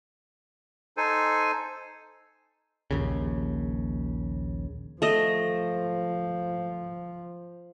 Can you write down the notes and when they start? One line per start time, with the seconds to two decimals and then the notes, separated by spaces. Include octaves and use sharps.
0.97 D#4 A4 C5 G#5
2.91 A#1 D#2 C#3
5.02 F3 A3 D#5